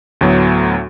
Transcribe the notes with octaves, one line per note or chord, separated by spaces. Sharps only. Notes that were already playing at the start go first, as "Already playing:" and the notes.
D2 A2 F#3 B3